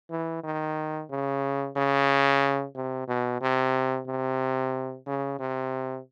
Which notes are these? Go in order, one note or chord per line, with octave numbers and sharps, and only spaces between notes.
E3
D#3
C#3
C#3
C3
B2
C3
C3
C#3
C3